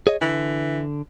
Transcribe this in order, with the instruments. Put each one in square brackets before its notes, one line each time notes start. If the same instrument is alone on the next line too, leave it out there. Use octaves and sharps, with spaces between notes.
[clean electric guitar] G#4 C#5 D#5
[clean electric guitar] D3 [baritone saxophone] E3